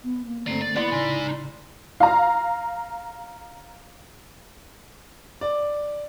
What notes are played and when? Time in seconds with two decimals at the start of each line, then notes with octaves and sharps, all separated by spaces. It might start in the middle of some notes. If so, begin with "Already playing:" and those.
0.04 B3
0.26 A#3
0.47 D3 A3 C4 D5 A#5
0.62 D5
0.76 B3 E4 D5 B5 C6
0.92 A2 C#3 D#4 G#5
2.00 F5 A#5
5.41 D5